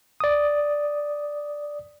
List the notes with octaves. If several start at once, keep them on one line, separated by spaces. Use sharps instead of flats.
D5 D#6